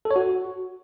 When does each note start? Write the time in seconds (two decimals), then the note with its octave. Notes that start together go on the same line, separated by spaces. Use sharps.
0.05 A4
0.11 C#5
0.16 F#4